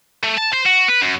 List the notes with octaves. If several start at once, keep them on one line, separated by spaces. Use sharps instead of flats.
A3
A5
C5
F#4
B4
F#2